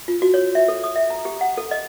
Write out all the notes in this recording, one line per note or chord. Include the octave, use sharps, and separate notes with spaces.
F4
F#4
C#5
E5
A4
D#6
E5
A#5
G4
F#5
A4
D#5